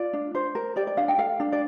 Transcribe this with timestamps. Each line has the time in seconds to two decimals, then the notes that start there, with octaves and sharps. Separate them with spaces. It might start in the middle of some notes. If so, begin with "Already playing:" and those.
Already playing: F4 D5
0.13 D4
0.35 D4 C5
0.55 A#4
0.76 G4 D5
0.87 D5
0.97 D4 F5
1.08 G5
1.18 A4 F5
1.40 D4
1.52 D5